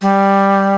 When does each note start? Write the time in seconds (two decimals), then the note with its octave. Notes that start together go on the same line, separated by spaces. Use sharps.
0.02 G3